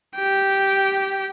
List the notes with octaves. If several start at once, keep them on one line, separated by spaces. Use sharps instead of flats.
G4 G5